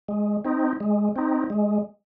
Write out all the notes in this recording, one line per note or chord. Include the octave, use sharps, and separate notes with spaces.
G#3
C4 D#4
G#3
C4 D#4
G#3